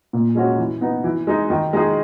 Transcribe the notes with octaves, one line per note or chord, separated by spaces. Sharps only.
A#2
G#3 C#4 F#4 C#5
E3
B3 D#4
E3
G#3 D#4
D#3
G#3 D#4 G#4